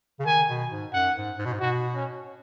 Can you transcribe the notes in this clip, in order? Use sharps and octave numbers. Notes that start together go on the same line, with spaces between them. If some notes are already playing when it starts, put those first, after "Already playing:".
C#3
D#3 G#5
B2
G#2
F#2 F#5
G#2
G#2
B2
G#2
B2 F#4
C#4